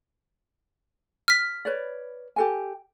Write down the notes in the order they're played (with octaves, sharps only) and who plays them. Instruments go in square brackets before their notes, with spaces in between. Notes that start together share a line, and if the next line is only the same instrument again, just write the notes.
[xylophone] F6 B6
[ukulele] B4 C#5 D5
G4 A4 G#5